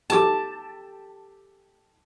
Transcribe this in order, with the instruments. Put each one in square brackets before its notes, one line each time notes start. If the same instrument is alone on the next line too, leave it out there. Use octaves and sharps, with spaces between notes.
[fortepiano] G4 A4 D6 [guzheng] A5